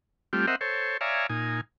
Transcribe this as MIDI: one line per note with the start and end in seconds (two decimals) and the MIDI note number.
0.33 0.46 55
0.33 0.46 57
0.33 0.46 60
0.33 0.46 65
0.33 0.46 67
0.47 0.56 60
0.47 0.56 70
0.47 0.56 72
0.47 0.56 75
0.47 0.56 76
0.47 0.56 78
0.61 0.97 69
0.61 0.97 72
0.61 0.97 73
1.01 1.27 73
1.01 1.27 74
1.01 1.27 76
1.01 1.27 77
1.01 1.27 80
1.01 1.27 82
1.29 1.61 46
1.29 1.61 63
1.29 1.61 80